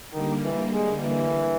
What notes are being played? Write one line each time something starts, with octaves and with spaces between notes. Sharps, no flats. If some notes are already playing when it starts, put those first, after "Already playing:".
D3 D#3 G3 A#3
E3
G#3
E3